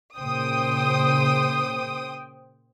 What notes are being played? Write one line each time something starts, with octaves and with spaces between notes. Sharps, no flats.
A#2 C#3 C5 G5 D#6